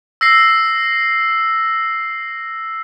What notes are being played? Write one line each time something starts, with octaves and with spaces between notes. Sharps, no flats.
E6 A#6 C7